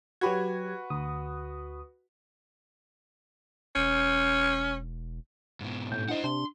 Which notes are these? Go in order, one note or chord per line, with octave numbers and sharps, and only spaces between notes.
F#3 F#4 G4 B4 G#6
D2 D#6
E1 C#4
G#2 B2
A2 G6
D4 E4 C5 D#5 F#5
C3 D4 C6